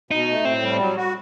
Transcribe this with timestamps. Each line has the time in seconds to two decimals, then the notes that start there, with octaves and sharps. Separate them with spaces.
0.11 B2 D#4
0.29 A3
0.45 A2 C4
0.62 G3
0.79 F#3
0.96 F#4